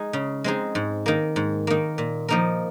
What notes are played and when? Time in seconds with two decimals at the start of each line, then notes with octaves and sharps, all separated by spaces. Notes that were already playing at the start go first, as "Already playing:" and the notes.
Already playing: G#3 D#4 G#4
0.13 C#3
0.44 G#3 C4 D#4 G#4
0.75 G#2
1.06 D#3 A#3
1.36 G#2
1.67 D#3 A#3
1.98 A#2
2.28 F3 A#3 D#4 A#4